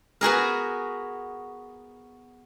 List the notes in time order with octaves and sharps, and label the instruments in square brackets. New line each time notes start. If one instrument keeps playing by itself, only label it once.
[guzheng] B3 F#4 G#4 A#4